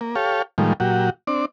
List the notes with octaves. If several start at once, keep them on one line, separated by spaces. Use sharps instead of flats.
A#3
G4 A4 C#5 F5
A2 D#3 F3 G3 G#3 A#3
A#2 F#3 F#4 G4
C4 D4 D5